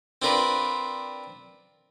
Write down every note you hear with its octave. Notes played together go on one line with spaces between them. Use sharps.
C4 D4 F4 A#4 B4